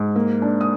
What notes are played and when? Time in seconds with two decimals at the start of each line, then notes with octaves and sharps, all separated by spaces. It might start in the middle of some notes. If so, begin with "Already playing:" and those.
Already playing: G#2
0.16 A#3
0.42 D4
0.61 D#6